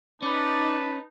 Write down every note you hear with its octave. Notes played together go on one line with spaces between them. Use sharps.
C#4 D#4 B4 D5 A5